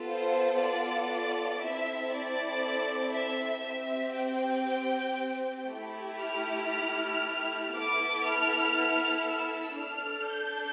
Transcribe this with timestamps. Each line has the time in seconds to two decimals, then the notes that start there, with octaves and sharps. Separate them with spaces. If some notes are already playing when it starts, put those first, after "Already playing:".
Already playing: B3 F4 A4
0.10 C5
0.61 D5
1.63 C4 E4 A4 E5
2.13 D5
3.15 E5
3.66 C4 G4 E5
4.17 G5
5.69 A3 E4 G4
6.20 F6
6.71 F6
7.72 B3 E4 A4 D6
8.23 F6
9.25 E6
9.76 D4 A4 F6
10.26 G6